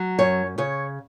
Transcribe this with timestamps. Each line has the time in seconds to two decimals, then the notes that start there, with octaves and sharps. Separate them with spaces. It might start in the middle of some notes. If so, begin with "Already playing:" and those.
Already playing: F#3
0.19 F#2 C#5
0.58 C#3 C#5